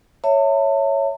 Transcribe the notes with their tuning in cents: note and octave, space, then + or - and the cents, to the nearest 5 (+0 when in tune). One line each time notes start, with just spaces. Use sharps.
C#5 +0 E5 +0 A5 +40